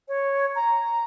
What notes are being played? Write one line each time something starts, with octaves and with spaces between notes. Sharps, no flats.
C#5
A#5